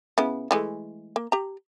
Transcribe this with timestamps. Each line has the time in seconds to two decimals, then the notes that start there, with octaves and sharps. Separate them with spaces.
0.18 C#3 B3 E4
0.51 E3 G#3 A3
1.16 A#3
1.32 G4 A#5